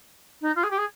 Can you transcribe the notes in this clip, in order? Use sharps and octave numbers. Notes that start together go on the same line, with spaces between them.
D#4
F4
G#4
G4
G#4